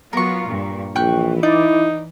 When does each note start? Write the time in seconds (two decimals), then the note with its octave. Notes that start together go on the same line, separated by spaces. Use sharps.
0.13 F#3 B3 F4 A#4 C#6
0.46 G2 A#2
0.96 A#1 E3 G5 C#6 F#6
1.43 D#4 E4 D5